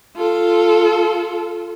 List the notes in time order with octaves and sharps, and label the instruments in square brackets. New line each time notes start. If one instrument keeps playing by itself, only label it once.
[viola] F4 A4